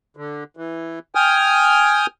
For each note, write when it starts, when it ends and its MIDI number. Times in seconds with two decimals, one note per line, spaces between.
0.17 0.44 50
0.57 0.99 52
1.15 2.06 79
1.15 2.06 80
1.15 2.06 87
1.15 2.06 89